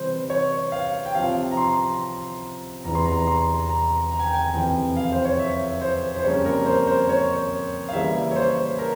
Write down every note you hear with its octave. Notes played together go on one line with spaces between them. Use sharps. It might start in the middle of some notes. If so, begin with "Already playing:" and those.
Already playing: C3 E3 G3 C4 C5
C#5
F5
G5
C3 F3 C4 F5
A#5
C6
E2 C3 E3 A#5
C6
A#5
A#5
C6
A#5
A#5
G#5
G5
G#5
F2 C3 E3 G5
F5
C5
C#5
E5
C5
C5
F2 C#3 G3 A#3 C#4 C#5
A#4
C5
C5
C#5
F5
C#3 E3 G3 A#3 E5
C#5
C5
A#4